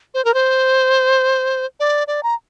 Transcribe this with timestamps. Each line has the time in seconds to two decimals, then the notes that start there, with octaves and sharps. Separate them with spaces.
0.14 C5
0.25 A#4
0.34 C5
1.80 D5
2.08 D5
2.23 A#5